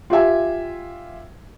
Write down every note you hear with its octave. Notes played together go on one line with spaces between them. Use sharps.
F4 G4 E5 G#5